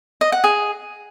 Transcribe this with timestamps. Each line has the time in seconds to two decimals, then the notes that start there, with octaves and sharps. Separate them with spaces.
0.21 D#5
0.32 F#5
0.44 G#4